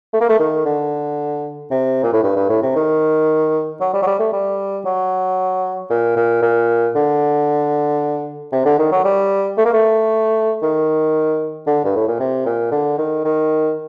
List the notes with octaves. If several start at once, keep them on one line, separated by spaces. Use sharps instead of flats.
A3
A#3
A3
D#3
D3
C3
A#2
A2
G2
G2
A2
C3
D#3
F#3
G3
F#3
G3
A3
G3
F#3
A#2
A#2
A#2
D3
C3
D3
D#3
F#3
G3
A3
A#3
A3
D#3
D3
G2
A2
A#2
C3
A#2
D3
D#3
D#3